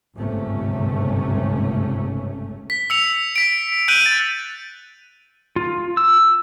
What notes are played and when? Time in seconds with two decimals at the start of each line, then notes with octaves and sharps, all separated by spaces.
0.17 G1 C#2 G#2 C3 A3 C#4
2.70 B6
2.90 E6 C#7 F7
3.36 B6 D7
3.88 F#6 G6 D7 D#7 F#7
4.06 A6
5.56 F4
5.97 E6